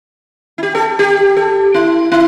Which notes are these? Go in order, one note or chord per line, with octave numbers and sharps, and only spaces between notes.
E4
G4
A4
G4
A4
E4
E4